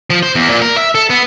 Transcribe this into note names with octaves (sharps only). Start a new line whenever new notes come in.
F3
C5
E2
A#2
A#4
E5
A4
B3